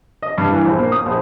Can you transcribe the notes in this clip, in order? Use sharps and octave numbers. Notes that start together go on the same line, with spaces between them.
D#5
G2
E3
A#1
A#3
D#6
A#1